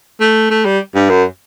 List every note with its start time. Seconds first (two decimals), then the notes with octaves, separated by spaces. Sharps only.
0.21 A3
0.50 A3
0.65 G3
0.95 G2
1.09 F#2